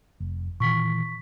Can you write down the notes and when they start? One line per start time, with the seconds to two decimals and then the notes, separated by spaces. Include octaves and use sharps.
0.20 F1
0.60 A#2 D#3 E3 C#6 B6